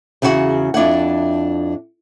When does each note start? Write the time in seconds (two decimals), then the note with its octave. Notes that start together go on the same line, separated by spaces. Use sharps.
0.22 E2 C#3 E4 F#4 F#5
0.74 F2 D4 E4 F#5